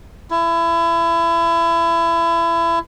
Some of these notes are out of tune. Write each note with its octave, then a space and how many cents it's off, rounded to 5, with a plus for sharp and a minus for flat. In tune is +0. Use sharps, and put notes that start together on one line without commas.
E4 +30